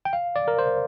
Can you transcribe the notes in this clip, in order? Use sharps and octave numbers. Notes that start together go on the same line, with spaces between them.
G5
F5
D5
A#4
C5